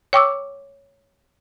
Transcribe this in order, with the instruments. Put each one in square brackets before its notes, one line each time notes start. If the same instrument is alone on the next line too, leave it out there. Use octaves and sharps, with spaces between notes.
[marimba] C#5 G5 C#6 D6 E6